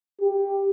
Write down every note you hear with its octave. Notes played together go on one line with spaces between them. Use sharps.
G4